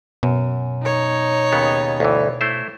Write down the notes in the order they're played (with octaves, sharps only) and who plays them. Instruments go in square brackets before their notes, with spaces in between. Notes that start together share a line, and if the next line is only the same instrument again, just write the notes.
[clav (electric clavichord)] F#2 [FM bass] B2
[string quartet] D#4 C#5
[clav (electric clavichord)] D#2 C#3 B3
D2 G2 E3
A3 E4 C5